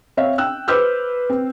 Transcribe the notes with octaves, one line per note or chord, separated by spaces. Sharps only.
C4 C#5 E5 F5
G5 E6 F#6
B4 C5 D6 E6 F6 G6
C4